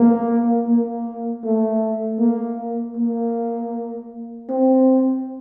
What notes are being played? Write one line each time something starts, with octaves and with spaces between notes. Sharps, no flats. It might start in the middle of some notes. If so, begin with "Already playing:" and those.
Already playing: A#3
A#3
A3
A#3
A#3
C4